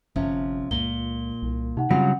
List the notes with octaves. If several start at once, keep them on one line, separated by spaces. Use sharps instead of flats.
G1 C3 F3 C#4
C#2 A#2 G7
C2
C3 D#4 F#5
C#3 F#3 G3 C4 F4 F#5